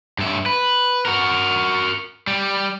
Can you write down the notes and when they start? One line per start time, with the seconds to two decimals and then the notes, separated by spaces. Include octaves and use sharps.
0.19 G2 E5
0.46 B4
1.05 F#4 A#4
2.27 G3